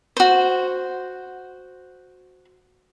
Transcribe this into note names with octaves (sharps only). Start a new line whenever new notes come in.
F#4 C5